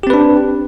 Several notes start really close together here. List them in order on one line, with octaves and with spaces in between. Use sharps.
G4 C4 B4 D4